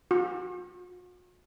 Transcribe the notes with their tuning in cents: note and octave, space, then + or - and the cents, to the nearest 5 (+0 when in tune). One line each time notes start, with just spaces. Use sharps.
F#4 -45